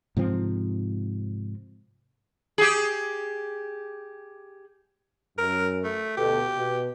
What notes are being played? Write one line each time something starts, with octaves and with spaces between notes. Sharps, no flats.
G#2 C3 F3 C4
G4 G#4
F#2 A#4
A3
D2 B2 G4 A4
B2